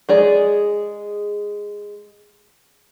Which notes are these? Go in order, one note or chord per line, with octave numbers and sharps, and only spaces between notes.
G#3 G#4 D5